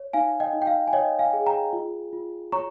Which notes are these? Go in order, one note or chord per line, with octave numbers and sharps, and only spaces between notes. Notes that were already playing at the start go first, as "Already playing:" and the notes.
Already playing: C#5
D#4 F5 G#5
D#5 G5
D#4
G5
F5
G#5
C#5 D#5 G5
F5 G#5
G#4
G5 A#5
F4
F4
C#5 A#5 C#6